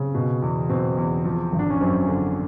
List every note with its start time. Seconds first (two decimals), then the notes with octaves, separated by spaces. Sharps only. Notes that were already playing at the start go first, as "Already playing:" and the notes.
Already playing: C#3 C4
0.14 B2
0.42 E2
0.69 B2 C4
0.97 E2
1.25 F3
1.53 G#1
1.59 D4
1.70 C#4
1.81 F#2 C4
2.09 D3